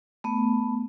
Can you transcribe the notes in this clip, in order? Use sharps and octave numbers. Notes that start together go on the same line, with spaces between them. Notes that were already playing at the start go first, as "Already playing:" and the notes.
A3 B3